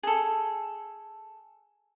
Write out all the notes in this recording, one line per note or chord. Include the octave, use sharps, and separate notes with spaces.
G#4 A4